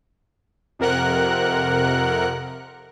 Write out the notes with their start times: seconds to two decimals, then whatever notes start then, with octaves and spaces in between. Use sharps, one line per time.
0.79 F2 C3 A#4 F#5 F#6